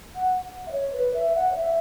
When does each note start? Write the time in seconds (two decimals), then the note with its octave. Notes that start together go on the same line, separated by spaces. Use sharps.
0.16 F#5
0.67 E5
0.71 C#5
0.93 B4
1.14 E5
1.35 F#5
1.51 C#5
1.56 E5